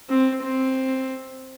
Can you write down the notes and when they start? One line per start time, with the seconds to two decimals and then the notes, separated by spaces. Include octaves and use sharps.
0.09 C4
0.43 C4